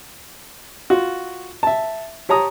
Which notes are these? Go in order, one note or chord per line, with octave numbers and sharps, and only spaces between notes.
F4 F#4
E5 A5
G4 C#5 A5 A#5 D#6